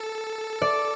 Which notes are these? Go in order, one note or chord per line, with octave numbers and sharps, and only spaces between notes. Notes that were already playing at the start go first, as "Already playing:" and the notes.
Already playing: A4
D5